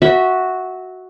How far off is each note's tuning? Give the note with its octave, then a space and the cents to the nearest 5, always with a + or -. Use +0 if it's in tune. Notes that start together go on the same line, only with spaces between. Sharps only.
F#4 +0 E5 -20 B5 +0